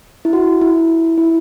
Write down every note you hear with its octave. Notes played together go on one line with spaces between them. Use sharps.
E4
F#4
E4
E4